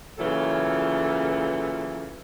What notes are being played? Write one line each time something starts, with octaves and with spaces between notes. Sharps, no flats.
A#2 C#3 E3 F#3 F4 A4